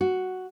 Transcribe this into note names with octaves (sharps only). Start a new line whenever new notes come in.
F#4